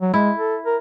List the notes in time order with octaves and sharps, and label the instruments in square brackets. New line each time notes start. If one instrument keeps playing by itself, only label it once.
[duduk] F#3
[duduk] G#3 [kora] E4
[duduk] A4
A#4